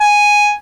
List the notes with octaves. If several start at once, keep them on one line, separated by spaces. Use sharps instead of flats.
G#5